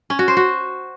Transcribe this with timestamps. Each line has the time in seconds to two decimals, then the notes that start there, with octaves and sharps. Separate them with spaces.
0.10 C#4
0.19 F#4
0.28 C5
0.37 F#4